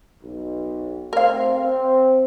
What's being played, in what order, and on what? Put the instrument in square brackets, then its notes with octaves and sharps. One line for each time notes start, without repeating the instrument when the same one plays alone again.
[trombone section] B1
[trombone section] A3 C4 [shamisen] A#4 F5
[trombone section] C4